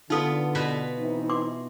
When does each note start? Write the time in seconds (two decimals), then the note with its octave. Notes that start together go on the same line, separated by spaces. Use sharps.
0.10 D3 B3 D#4 F4 A4
0.55 B2 B4 B5
0.99 E3 C4 D#4
1.30 C6 D6